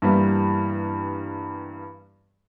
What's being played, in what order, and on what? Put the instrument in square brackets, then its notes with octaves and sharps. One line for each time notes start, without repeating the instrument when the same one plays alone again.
[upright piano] G2 E3 G3 A#3 B3 E4